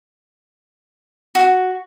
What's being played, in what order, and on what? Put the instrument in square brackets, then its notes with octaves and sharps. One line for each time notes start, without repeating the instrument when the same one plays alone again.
[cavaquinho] F#4